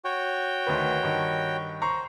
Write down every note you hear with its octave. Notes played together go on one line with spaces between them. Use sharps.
F#4 C#5 G5
D2 D#3 B4
G2 D#3
C5 A#5 C#6